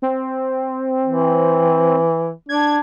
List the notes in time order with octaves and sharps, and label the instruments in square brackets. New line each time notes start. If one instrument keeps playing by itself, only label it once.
[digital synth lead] C4
[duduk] E3
[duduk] D4 [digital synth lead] G#6